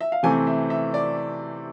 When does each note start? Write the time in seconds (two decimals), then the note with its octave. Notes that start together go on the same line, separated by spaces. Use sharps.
0.01 E5
0.12 F5
0.23 C3 E3 A3 C4 G#5
0.47 E5
0.70 E5
0.94 D5